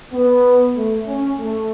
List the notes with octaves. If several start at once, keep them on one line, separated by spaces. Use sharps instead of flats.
B3
A3
C#4
A3